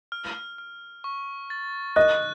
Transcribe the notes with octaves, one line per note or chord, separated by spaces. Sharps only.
F6
F6
C#6
A6
D#5 F#6